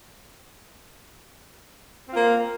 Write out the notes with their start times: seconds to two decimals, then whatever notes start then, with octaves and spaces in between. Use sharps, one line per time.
2.09 C4
2.12 F4
2.15 A#3